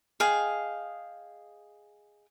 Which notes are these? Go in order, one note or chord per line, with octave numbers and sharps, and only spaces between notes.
G#4 D#5 F5 G5